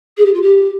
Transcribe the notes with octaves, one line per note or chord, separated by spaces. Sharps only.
G#4
G4
F4
G4